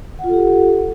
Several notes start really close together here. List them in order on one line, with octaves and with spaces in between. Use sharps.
F#5 F4 A4 G4